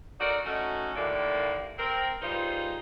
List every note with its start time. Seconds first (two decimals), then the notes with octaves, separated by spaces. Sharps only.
0.20 D#4 F#4 A4 A#4 D5
0.46 A3 C#4 D#4 F#4
0.96 D#2 A2 D3 A#3 D5
1.78 C4 A#4
2.22 G3 D#4 F4 G#4 B4 C5